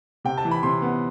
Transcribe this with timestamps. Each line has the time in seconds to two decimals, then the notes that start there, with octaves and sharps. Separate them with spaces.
0.25 C3 G5
0.37 A5
0.45 E3
0.51 B5
0.63 C3 C6
0.82 B3